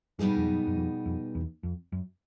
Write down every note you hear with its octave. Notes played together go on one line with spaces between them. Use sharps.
G2 B2 G3 B3 D#4 G#4
F2
F#2
F#2
F2
F2
E2
F2
F#2